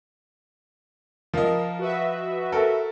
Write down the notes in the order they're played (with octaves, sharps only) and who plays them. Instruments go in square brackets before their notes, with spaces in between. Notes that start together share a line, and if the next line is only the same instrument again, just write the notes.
[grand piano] F3 F4 D#5 [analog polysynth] A#4
[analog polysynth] F#4 B4 E5
[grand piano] A4 A#4